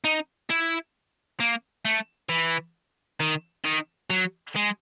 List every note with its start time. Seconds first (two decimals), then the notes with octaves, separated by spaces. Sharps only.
0.04 D#4
0.50 E4
1.40 A#3
1.85 A3
2.29 E3
3.20 D#3
3.65 D#3
4.10 F#3
4.56 G#3